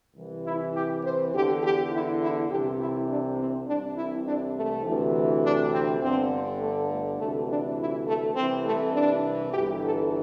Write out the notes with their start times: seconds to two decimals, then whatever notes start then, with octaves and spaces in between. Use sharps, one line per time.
0.16 C2 C3 E3
0.46 E4
0.75 G4
1.04 C5
1.33 E2 D3 G4
1.63 G4
1.92 E4
2.20 E4
2.50 C2 C3 E3 G4
2.79 E4
3.08 D4
3.39 C4
3.67 C2 C3 E3 D4
3.97 E4
4.26 D4
4.55 A3
4.84 D2 C3 E3
5.43 D4
5.72 C4
6.01 G1 G2 D3 C4
6.60 A3
6.90 A3
7.18 D2 C3 E3 A3
7.48 D4
7.78 E4
8.06 A3
8.36 C2 C3 E3 C4
8.65 A3
8.94 D4
9.52 G1 G2 E3 G4
9.82 A4